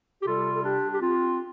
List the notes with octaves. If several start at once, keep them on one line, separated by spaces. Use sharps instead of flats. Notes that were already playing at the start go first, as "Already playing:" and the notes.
G4
C3 G3 F4 A4
A4
D4 G4
G4
C4 F4